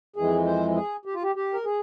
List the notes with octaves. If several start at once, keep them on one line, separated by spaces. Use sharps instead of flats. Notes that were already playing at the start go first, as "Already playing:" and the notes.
F2 E3 G#3 G#4
C5
G#4
G4
F4
G4
G4
A#4
G#4